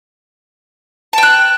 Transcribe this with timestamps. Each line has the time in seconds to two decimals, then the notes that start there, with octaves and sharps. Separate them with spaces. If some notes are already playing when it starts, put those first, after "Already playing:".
1.13 A5
1.18 G5
1.23 F#6